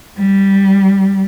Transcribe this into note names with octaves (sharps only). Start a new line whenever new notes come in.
G3